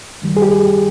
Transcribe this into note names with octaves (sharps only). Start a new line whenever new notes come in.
G2 D#3 G3
G#4
G4